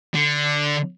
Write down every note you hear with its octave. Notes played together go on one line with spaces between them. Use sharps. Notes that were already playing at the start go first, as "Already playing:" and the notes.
D3